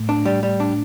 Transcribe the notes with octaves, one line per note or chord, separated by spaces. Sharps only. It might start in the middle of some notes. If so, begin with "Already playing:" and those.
Already playing: A2 A3
D4
G3
G3
D4